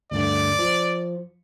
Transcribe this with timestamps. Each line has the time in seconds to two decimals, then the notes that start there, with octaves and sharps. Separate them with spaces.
0.11 D2 G2 D3 D5
0.59 F3